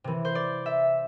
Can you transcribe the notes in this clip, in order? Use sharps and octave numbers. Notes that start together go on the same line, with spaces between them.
C3 E3
C5
D5
E5